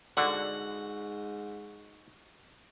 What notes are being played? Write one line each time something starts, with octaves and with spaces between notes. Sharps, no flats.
G#2 D3 F#4